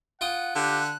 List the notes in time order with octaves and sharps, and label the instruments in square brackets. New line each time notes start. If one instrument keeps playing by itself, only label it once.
[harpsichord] F4 G5 D#6 [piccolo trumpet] F#5
[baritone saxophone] D3 [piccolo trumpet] G4 [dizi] F#6